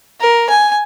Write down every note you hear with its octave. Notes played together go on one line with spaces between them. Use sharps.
A#4
G#5